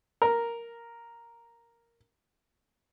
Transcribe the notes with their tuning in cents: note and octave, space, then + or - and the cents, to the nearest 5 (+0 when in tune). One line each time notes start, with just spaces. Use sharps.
A#4 +0